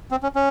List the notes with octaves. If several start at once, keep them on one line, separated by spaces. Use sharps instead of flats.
C4
C#4
C#4